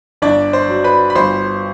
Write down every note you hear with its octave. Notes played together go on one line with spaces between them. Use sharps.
G1 D4 D5
C5
F#3
B4 B5
B5
G1 C5 C6